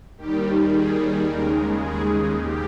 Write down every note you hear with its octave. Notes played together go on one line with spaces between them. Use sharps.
D#2 D#3 G3 G4
G#4
D#2 C#3 G#3 A#4
G#4
G#2 G4